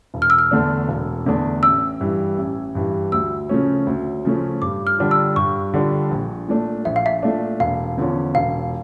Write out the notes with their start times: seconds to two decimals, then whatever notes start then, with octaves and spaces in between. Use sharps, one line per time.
0.14 E1
0.22 F6
0.30 E6
0.39 F6
0.51 E2 D3 A3 D4
0.88 E1
1.26 E2 D3 A3 D4
1.63 A1 E6
2.00 G2 E3 G3
2.37 A1
2.75 G2 E3 G3
3.12 D2 E6
3.49 C#3 F3 A3 C#4
3.87 D2
4.25 C#3 F3 A3 C#4
4.62 G2 D6
4.87 F6
4.99 D3 G3 D4 F4
5.11 E6
5.36 G2 C#6
5.74 D3 G3 D4 F4
6.11 A#1
6.48 A#2 A3 D4
6.85 A#1 E5
6.96 F5
7.06 E5
7.23 A#2 A3 D4
7.60 E1 F5
7.98 E2 D3 F3 C#4
8.35 E1 F5